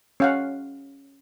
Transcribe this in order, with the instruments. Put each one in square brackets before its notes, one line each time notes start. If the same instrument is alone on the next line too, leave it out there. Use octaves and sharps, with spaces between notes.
[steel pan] C#4 F5 F#5